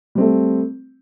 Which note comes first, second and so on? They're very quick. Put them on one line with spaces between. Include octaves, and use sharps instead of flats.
G3 C4 A3